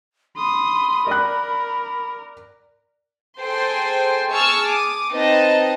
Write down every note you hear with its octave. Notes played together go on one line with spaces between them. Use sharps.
B5 C6 D#6
A#4 D5 F#6
G#4 A4 C5 G5 C6
G#4 A5 C#6 E6 F6
D6 D#6
C4 D#4 B4 D#5 A5